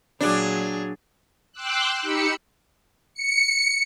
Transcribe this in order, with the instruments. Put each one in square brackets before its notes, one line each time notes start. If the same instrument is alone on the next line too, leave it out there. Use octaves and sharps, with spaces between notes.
[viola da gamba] A#2 F#3 G#4 [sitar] D4
[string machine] G5 C6 D6 E6 F#6
D#4 G4 B5 E6 C#7
C#7